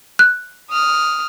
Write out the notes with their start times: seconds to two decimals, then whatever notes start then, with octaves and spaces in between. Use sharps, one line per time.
0.19 F#6
0.70 D#6 F6